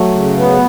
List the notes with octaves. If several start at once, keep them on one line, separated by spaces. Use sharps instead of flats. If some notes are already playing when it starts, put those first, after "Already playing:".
Already playing: F#3 A3
C#3
B3